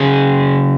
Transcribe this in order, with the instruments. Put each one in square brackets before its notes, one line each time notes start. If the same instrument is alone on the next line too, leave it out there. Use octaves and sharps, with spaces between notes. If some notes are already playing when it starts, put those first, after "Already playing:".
Already playing: [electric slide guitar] C#3 F#3 C#4 G#4